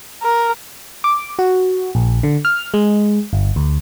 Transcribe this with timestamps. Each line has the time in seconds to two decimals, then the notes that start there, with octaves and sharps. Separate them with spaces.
0.22 A#4
1.04 D6
1.39 F#4
1.95 A#1
2.23 D3
2.45 F6
2.74 G#3
3.33 G1
3.56 D2